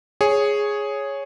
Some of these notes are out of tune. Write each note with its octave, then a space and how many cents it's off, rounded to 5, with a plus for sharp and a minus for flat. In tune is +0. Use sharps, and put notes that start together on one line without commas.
G#4 +0 C#5 +0